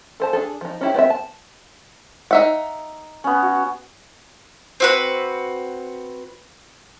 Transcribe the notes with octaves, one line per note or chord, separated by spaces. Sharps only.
A4 C5 A5
D4 G#4 A4
F3 D#4
C#4 E4 G4
B3 C4 D5 E5
A5
D#4 E5 F#5
B3 C#4
F#4
C4 F#4 B4